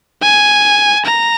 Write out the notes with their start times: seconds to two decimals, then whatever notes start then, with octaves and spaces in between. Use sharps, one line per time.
0.22 G#5
1.06 A#5